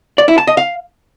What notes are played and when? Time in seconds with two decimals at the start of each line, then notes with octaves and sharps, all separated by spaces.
0.18 D5
0.28 E4
0.38 A5
0.47 D#5
0.57 F5